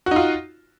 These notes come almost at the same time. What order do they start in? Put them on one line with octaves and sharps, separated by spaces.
F#4 D#4 F4